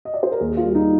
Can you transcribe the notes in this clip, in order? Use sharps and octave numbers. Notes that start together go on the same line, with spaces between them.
D#5
D5
C5
A#4
D#2 G#4
F4
G3
F4
D#4